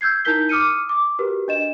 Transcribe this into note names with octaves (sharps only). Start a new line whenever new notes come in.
E6 G6 G#6 C7
D#4 E4 A#4 G6 B6 G7
D6 D#6 F6 C#7 D#7
D6
F#4 G4 A#4 B4
D4 D#5 E7